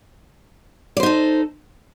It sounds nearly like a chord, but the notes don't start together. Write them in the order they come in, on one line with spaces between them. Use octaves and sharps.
D5 C5 D#4 A4